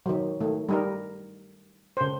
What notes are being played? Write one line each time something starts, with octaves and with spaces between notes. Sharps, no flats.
D#3 F#3
D#3 A3
G3 D#4 A#4
C#3 C5